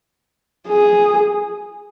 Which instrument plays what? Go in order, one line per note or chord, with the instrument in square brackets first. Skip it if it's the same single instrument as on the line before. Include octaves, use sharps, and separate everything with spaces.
[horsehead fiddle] G#4